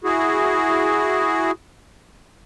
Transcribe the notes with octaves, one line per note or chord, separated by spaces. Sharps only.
E4 F#4 G#4